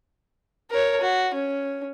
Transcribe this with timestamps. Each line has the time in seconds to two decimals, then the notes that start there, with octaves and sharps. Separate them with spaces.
0.70 A#4 C#5
1.01 F#4
1.34 C#4